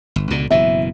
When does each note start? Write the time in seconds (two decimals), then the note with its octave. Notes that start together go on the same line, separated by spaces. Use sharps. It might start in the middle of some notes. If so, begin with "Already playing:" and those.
0.16 G1
0.30 C#2 B2 D3
0.51 F#1 B2 E3 E5